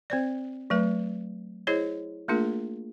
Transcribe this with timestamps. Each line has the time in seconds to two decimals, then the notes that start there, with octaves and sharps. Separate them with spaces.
0.10 C4 C5 D5
0.70 F#3 A3 B4
1.67 E4 G#4 C5 C#5 D#5
2.28 A3 A#3 D4 F4 G#4 A#4